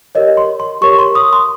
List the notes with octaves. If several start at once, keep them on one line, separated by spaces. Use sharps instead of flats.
G4 A#4 C#5 D#5
C6
C6
G4 A#4 C#5 C#6
C6
D#6
C6